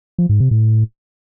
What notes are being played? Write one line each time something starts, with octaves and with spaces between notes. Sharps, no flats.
F3
G#2
C3
A2